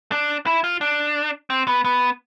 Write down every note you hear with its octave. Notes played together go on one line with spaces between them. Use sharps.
D4
E4
F4
D4
C4
B3
B3